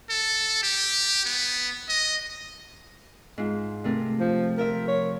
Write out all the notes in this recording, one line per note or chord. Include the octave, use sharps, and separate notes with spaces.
A4
G4
B3
D#5
G#2 F4
C3 A3 A#4
F3
F3 A#4 E5
C#5